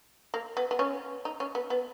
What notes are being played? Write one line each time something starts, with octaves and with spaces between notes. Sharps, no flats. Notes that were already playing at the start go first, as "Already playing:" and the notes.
A#3
B3
B3
C#4
D#4
C#4
B3
B3